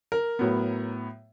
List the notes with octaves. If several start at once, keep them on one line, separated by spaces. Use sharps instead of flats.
A#4
A2 F#3 B3